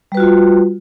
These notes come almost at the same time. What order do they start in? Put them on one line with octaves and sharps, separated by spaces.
G3 B4 F#4 F4